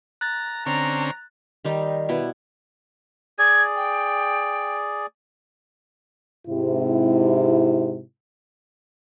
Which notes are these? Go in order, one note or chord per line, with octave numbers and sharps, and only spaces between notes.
A#5 F#6 A6
D3 C4 C#4 A#5
D#3 G3 D#4
B2 E4
G#4 D5 G#6
G5
G#2 C3 E4